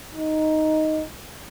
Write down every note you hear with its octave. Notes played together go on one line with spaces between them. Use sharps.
D#4